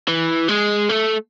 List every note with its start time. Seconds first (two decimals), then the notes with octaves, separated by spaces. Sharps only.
0.08 E3
0.49 G#3
0.89 A3